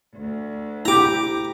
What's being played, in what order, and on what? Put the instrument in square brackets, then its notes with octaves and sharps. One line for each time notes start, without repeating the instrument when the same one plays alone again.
[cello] D2
[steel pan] E4 G4 [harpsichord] A#5 D6